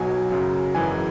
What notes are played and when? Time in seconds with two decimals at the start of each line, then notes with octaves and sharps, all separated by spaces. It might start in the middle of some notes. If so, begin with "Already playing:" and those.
Already playing: B1 B2 F#3 G#5
0.31 F#2 C#3 F#3
0.75 G#1 F#2 E3 G#3 G#5